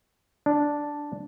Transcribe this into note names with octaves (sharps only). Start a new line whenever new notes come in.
D4